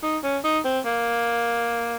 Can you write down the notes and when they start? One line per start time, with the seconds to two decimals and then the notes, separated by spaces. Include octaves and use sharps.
0.03 D#4
0.24 C#4
0.44 D#4
0.65 C4
0.85 A#3